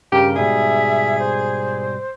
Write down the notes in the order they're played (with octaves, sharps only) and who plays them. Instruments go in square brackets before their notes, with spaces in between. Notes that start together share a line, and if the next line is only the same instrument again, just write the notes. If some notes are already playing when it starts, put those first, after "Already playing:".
[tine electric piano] G2 C#3 A#4 [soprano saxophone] G4
[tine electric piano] G#2 B2 G3 [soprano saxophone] G#4 [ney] E5
[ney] C5